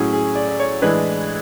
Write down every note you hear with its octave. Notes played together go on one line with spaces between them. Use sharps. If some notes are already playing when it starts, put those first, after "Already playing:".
Already playing: A2 F#3 C#4 G#4
G#4
D5
D5
C#5
A2 E3 G#3 D4 B4